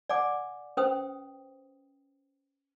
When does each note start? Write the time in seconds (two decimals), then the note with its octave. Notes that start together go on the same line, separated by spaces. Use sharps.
0.09 D5 F#5 G#5 D6
0.77 C#4 B4 C5 G5 D#6